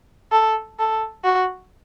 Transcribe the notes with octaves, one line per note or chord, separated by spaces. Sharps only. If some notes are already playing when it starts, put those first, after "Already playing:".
A4
A4
F#4